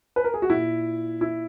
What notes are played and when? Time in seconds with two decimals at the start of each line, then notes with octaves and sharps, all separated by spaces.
0.16 B4
0.24 A#4
0.34 G#4
0.42 F#4
0.50 A#2 E4
1.21 E4